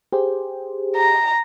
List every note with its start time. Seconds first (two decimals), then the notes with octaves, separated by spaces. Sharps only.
0.12 G4 G#4 C5
0.96 A#5